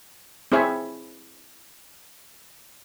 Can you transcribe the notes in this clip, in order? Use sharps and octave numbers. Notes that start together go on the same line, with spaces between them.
C4 E4 G#4 C#5 E5